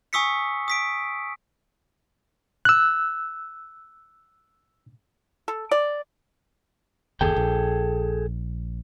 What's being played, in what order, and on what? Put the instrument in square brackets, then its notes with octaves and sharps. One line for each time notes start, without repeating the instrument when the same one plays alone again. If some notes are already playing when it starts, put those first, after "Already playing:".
[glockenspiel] G#5 C#6 D#6 E6 B6 C#7
D#6 B6 D7
[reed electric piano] E6 F#6
[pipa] A4
D5
[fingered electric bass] F#1 D#2 [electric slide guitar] G#4 A4 G5
[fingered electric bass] A#1